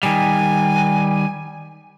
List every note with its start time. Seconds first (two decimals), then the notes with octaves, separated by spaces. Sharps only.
0.03 D#3 G3 G#5